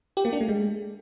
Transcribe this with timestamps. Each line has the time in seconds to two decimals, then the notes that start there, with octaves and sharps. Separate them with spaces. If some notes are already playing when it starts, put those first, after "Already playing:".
0.17 G4
0.25 A#3
0.33 D4
0.41 A3
0.49 G#3